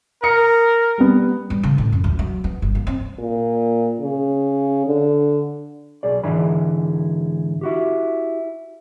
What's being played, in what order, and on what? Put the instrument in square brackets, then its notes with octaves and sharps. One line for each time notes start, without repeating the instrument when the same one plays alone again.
[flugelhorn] A#4 [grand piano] D#6 A#6 C#7
[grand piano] G3 B3
[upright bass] G3
C#3
A2
F#2
D2
F#3
B3
G1
A#3
C4
[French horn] A#2
C#3
D3
[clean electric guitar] B1 G#4 D5
G#2 D3 E3 G#4 B5
E4 F#4 G4